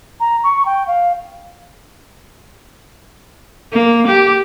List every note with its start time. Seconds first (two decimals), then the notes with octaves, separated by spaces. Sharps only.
0.20 A#5
0.44 C#6
0.66 G5
0.87 F5
3.72 A#3
4.07 G4